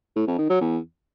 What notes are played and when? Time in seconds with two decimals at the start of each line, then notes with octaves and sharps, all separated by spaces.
0.16 A2
0.27 F2
0.38 D#3
0.50 F#3
0.61 E2